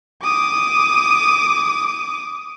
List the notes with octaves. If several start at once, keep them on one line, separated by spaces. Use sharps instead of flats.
D6 D#6